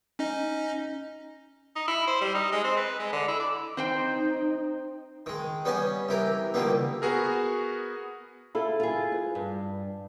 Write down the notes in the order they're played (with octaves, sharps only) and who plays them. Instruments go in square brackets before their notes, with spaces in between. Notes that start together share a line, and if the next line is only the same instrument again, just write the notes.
[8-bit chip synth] C#4 D#4 D#5
[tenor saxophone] D#4
E4
C5
G3
D#4
G#3
C4
B4
G#3
D3
E4
D5
[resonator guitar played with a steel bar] C4 C5 G5 [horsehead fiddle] D#4
[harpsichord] D#3 G#3
G3 B3 C#4 D#5 G#5
C2 E3 G4 A#4
C#2 D3 D#3 G3 A#3 B3
[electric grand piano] B3 F#4 G#4 A#4
[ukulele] E4 A4 B5 [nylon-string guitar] F4
[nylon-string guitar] F4 G#4
[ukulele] B4
[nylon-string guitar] G2